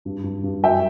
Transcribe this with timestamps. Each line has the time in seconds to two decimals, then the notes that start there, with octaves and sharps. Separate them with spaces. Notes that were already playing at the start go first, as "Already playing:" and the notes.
0.05 G2
0.24 G2
0.43 G2
0.63 F#2 E5 G5